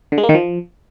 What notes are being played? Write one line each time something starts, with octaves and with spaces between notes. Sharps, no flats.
D3
G#3
A#3
D#3
F3